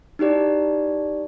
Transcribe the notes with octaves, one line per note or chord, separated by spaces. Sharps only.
D#4 E4 G4 D5